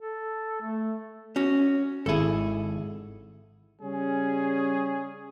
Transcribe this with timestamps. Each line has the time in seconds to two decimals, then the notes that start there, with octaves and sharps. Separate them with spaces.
0.01 A4
0.62 A3
1.36 C#4 F#4
2.06 G#1 E4 G#4 A4
3.81 C#3 G3 C#4 G#4